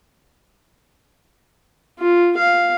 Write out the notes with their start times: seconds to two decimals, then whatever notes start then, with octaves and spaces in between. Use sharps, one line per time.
1.99 F4
2.38 F5